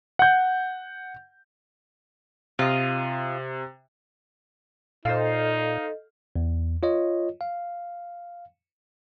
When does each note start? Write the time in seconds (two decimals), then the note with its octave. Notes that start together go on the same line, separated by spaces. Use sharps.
0.19 F#5 G6
2.59 C3 F4 D#5
5.05 A#2 D#4 A4 C5 D#5 F5
6.36 E2
6.83 F4 C#5 D#5
7.41 F5